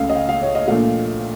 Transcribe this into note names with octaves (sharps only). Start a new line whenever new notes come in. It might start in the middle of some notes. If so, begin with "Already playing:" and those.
Already playing: C#2 C#3 A3 F5
D#5
F5
F5
C#5
D#5
A#1 A#2 A3 F5